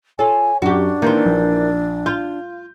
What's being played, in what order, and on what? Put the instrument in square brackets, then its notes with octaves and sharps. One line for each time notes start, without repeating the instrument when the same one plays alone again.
[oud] F4 A4 [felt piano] C#5 [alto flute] G#5
[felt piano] F#2 [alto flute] D4 [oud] F#4 G4
[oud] D#3 E3 C4 [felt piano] A#3
[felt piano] A#1
[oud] F4 [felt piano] G6